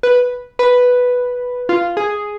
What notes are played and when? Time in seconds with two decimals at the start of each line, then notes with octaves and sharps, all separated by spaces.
0.03 B4
0.59 B4
1.69 F4
1.97 G#4